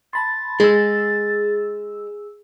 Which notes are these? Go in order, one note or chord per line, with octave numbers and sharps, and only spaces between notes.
A5 B5 C6 A6
G#3 G#4 E6